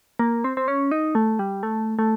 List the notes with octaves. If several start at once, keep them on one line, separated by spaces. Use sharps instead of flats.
A#3
C4
C4
C#4
D#4
A3
G3
A3
A3